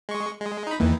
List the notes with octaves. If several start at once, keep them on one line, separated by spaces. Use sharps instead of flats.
G#3 C#6
G#3
D#4 B5
E2 D#3 E3 A#3